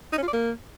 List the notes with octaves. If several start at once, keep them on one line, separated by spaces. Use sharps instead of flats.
D#4
C#4
F4
D5
A#3